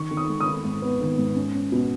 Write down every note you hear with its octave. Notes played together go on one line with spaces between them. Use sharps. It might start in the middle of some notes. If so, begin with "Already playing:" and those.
Already playing: D#3 C#6
D#3
D#6
G#3
D#6
D#3
G#2
B3
D#3
G#2
C#4
C#4
B2